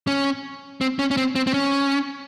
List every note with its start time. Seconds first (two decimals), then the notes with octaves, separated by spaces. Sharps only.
0.07 C#4
0.81 C4
0.99 C#4
1.11 C#4
1.17 C4
1.35 C4
1.47 C4
1.54 C#4